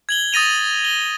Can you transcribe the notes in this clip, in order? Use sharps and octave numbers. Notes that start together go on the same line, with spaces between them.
G#6 F#7 G7
D#6 A6 A#6 D#7 F7
G7